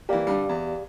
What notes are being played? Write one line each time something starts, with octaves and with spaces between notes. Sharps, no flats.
E3 A#3 G4 D5 F5
G2 D3 G3
E2